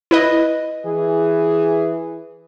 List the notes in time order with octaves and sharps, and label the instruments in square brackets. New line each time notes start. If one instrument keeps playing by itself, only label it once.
[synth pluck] E4 B4 D#5
[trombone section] E3 G#4